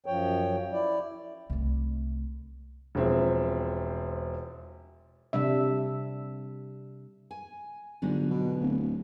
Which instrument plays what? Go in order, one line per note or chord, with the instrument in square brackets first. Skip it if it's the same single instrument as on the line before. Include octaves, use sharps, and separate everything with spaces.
[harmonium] F#2 F3 C#5 G5
E4 D5
[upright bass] C2 A3
[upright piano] E1 F3 C4 E5
[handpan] C3 G3 D4 E5
[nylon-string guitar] G#5
[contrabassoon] G1 [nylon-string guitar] G#2 D3 F#3
[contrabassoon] B2
D1